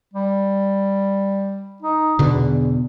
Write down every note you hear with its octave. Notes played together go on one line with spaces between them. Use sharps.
G3
D#4
E2 B2 D3